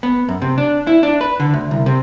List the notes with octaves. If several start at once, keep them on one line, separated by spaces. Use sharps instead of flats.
B3
F#2
C3
D4
E4
D4
B4
D3
D2
C2
C3